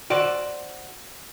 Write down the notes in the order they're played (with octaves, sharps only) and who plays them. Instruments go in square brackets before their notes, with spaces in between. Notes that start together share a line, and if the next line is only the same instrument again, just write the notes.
[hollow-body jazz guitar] F#4 C5 D5